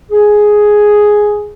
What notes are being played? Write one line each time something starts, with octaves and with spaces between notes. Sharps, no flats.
G#4